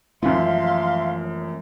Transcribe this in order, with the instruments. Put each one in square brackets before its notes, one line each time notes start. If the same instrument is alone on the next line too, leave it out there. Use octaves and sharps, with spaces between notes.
[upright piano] F#2 F3 [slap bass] E3 G#3 A3 [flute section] E5 F5 C6